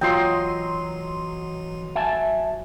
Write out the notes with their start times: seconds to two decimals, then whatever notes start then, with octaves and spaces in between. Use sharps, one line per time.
0.01 E3 F#3 F4 D#5 G5 C6
1.95 E5 G#5 A5